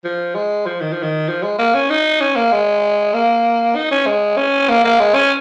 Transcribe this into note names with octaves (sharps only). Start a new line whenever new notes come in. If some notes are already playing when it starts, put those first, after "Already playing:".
F3
G#3
F3
D#3
F3
D#3
F3
G#3
A#3
C#4
D#4
C#4
A#3
G#3
A#3
D#4
C#4
G#3
C#4
A#3
A#3
G#3
C#4